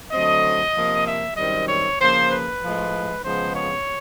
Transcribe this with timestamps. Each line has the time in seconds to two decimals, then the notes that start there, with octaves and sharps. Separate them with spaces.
0.12 D3 F#3 A3 C4 D#5
0.75 C3 F3 A#3
1.06 E5
1.37 F#2 D#3 G3 C4 D#5
1.69 C#5
2.00 C#3 F3 A#3 C5
2.31 B4
2.63 A2 F3 G#3
3.25 C#3 F3 G#3 B3 C5
3.55 C#5